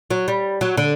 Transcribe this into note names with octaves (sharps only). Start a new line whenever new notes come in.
F#3
G3
F#3
D3